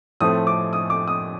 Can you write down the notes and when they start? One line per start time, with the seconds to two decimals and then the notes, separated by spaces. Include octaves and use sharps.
0.20 A2 F3 A3 C4 D#6
0.47 D6
0.73 D#6
0.90 D6
1.08 D#6